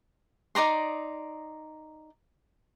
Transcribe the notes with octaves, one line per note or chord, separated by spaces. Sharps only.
D#4 D5 A#5 C6